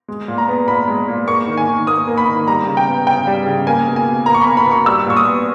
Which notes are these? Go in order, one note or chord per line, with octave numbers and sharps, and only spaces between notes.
G#3
A#2
A#5
B3
A#2 B5
G#3
A#2
A#3 C#6
D#3
G#5
D#3
A#3 D#6
A#3
B5
D#3
G3 A#5
C#3
G5
B3
C#3 G5
G3
C#3
A#3 G#5
B2
G#5
B2
A#3 A#5
C#6
A#3 B5
B5
B2 C#6
G3 E6
A#2 C#6
D#6
B3